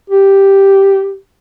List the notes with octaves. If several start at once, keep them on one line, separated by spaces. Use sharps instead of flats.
G4